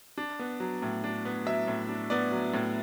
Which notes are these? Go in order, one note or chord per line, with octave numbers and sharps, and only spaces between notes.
D4
B3
F#3
A2
D4
B3
F#3 E5
A2
D4
B3 D5
F#3
A2